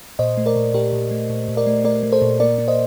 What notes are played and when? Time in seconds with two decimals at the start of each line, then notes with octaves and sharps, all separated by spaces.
0.19 A#2 C5 D#5
0.37 A3
0.46 A#4 D5
0.56 A#2
0.74 A#2 G4 A#4
0.93 A#2
1.11 A3
1.30 A#2
1.48 A#2
1.57 A#4 D5
1.67 A3
1.84 A3 A#4 D5
2.03 A3
2.12 A4 C5
2.22 A#2
2.40 A#3 A#4 D5
2.58 A#3
2.68 C5 D#5